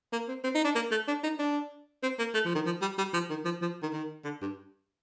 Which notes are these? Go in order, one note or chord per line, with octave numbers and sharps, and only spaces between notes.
A#3
C4
C4
D#4
D4
A#3
A3
D4
D#4
D4
C4
A#3
A3
F3
D#3
F3
G3
G3
F3
D#3
F3
F3
D#3
D#3
D3
G2